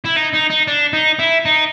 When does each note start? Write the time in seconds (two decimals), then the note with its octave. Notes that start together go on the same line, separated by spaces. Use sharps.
0.04 E4
0.16 D#4
0.33 D#4
0.50 D#4
0.67 D4
0.93 D#4
1.19 E4
1.45 D#4